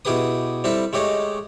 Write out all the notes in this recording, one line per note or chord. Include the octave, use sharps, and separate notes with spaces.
B2 E4 G4 G#4 B4 D#6
G3 C4 E4 A4 E5
G#3 A3 G4 C#5 D#5